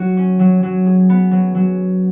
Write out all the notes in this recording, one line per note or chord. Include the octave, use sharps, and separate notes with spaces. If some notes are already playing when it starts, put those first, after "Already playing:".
Already playing: F#3 F#4
C#4
F#3
F#3
G#4
B3
F#3
F#3